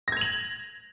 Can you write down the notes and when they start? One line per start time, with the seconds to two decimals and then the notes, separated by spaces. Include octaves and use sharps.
0.08 A#6
0.12 G#6
0.17 F7
0.21 F#7